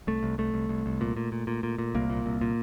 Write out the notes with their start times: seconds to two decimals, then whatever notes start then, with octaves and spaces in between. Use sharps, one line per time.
0.07 C2 A3
0.23 C2
0.38 C2 A3
0.54 C2
0.69 C2
0.86 C2
1.01 A#2
1.17 A#2
1.32 A#2
1.47 A#2
1.63 A#2
1.78 A#2
1.95 C2 A#3
2.10 A#2
2.26 C2
2.41 A#2